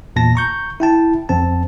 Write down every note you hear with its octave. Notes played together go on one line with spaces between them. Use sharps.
E2 A#2 A5 A#6
A#5 C#6 G6
E4 G5 A5
F2 C4 A5